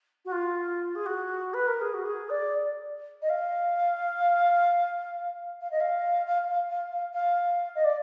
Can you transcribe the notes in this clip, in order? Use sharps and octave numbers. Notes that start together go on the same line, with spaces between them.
F#4
F4
G#4
F#4
B4
A#4
G#4
F#4
G#4
D5
D#5
F5
F5
D#5
F5
F5
F5
F5
F5
F5
D#5
D5